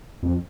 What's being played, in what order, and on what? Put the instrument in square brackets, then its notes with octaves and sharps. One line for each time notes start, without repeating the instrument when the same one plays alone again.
[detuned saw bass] F2